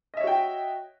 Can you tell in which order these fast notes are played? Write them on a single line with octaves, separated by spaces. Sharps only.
D#5 E5 C#5 F#4 G5